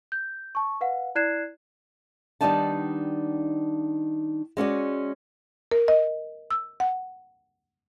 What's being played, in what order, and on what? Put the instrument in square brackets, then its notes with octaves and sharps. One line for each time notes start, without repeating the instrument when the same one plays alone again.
[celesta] G6
A5 C#6
B4 F5 F#5
E4 D5 F#6 G#6 C7 E7
[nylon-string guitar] D#3 G3 B3 D4 D#4 A5
G#3 C#4 F#4 D5
[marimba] A#4
D#5
E6
F#5